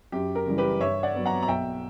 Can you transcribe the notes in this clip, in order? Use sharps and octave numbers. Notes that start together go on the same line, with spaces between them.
F#2 G4
A#4
C#3 E3 G3
G4 B4
G2 C#5 E5
D5 F#5
F#3 B3
F#5 A#5
A#5
B1 E5 G5